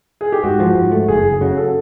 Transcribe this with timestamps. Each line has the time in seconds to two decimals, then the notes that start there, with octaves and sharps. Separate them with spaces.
0.21 G#4
0.32 G4
0.43 G#2 F#4
0.60 F3
0.75 G#2
0.92 A3
1.08 F#1 G#4
1.24 F#1
1.41 C#3 F#4
1.57 A4